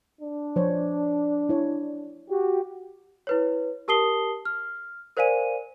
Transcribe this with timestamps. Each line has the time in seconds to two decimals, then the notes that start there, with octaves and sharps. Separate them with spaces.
0.22 D4
0.56 F3 C5 C#5
1.49 E4 C#5
2.30 F#4 G4
3.27 E4 B4 C#5
3.88 G4 A#4 A5 D#6 C7 G7
4.45 F6
5.17 A#4 C5 D5 F5 G#5 D#7